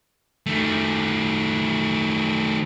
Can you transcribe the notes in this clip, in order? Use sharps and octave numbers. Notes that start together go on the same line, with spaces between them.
D#3 A3